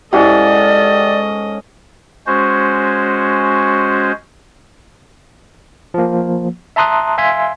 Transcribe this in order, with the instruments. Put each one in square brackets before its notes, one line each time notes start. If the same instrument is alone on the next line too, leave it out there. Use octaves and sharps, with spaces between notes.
[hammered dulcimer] G#2 C#4 F#5 [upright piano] E4 G4 [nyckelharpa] A4 D#5 [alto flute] D5
[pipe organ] G#3 C#4 F#4 C5
[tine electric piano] F3 A#3
E5 A5 A#5 C6 D#6 F#6
E5 F5 G#5 C6 G#6 B6